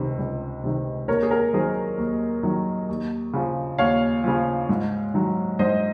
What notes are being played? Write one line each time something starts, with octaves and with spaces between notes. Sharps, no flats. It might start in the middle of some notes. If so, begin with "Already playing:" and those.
Already playing: C#2 C3 D#3
C#2
C3 D#3
D#2 A#4 C#5
G#4
A#4
D#3 F#3 G#4 C5
D#2
D#3 F#3
D#2
C#3 F3
D#2 C#5 F5
C#3 F3
G#2
D#3 F#3
G#2 C5 D#5